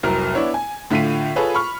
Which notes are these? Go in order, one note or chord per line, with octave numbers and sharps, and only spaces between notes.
F1 C2 F#3 A#4 F6
B3 D4 E4 C#5
G#5
A2 D3 F4 B6 C7 D#7
F4 G#4 A4 B4 C#5
B5 C#6 F6